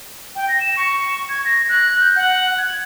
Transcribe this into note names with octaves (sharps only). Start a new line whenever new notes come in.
G5
A#6
E7
C#6
G#6
A#6
F#6
G6
F#5
G#6